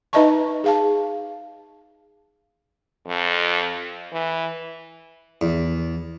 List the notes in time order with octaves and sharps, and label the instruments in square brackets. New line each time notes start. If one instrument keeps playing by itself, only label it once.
[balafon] D#4 B4 D#5 E5 A5 C#6
G#4 F5 A5
[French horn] F2
E3
[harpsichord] E2